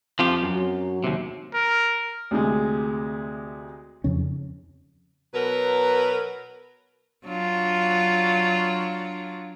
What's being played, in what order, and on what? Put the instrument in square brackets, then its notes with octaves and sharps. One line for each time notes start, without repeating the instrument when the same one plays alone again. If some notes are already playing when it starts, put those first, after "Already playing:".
[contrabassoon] F2 [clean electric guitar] F3 F4 G4
[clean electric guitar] F#2
[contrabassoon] F#3
[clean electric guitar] D#2 C3
[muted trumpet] A#4
[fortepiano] D2 C3 G#3
[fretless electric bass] F2 C#3 C#4
[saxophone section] B2 F#3 A#4 B4
[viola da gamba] F#3 D4 F4